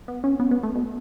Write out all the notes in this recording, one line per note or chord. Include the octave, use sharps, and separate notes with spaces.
B3
C#4
B3
B3
A3
B2